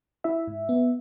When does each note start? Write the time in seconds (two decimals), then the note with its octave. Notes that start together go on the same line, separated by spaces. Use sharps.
0.24 E4 E5
0.47 G#2
0.69 B3